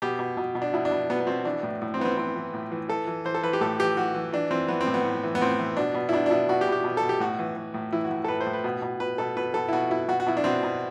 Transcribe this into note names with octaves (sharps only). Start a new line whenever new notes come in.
B2 G4
B2
B2
B2
D4
B2 E4
D4
B2
B2 B3
B3
B2 C4
E3 D4
A2
A2
C4
E3 B3
C4
E3 C4
E3
A2
E3
E3 A4
E3
E3 C5
A4
E3 B4
G4
A2 A4
E3 G4
E3 F#4
E3
E3 D4
E3 C4
E3 B3
C4
A2
B3
A2
E3
B3
A2 C4
E3
B2 D4
B2
E4
B2 D4
D4
B2 E4
B2 F#4
G4
B2
G4
B2
A4
B2
G4
A2 F#4
E3
E3
A2
E3 E4
F#4
A2
A4
A2 B4
C5
A2
B4
B2
B2
B2 B4
B2 A4
B2 B4
B2 A4
E4
B2 F#4
B2 E4
B2 F#4
F#4
B2 E4
D4
B2 C4
B2